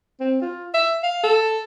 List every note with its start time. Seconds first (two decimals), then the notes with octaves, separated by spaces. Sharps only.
0.20 C4
0.42 F4
0.74 E5
1.03 F5
1.23 A4